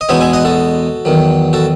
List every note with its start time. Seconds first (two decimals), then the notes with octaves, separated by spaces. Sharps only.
0.01 D#5
0.09 E2 B2 G#3 B3 D#4 C#5 E5
0.21 E5 G#5
0.33 D#5 F#5
0.45 F#4 A4
1.05 E2 D#3 F#3
1.53 F#4 A4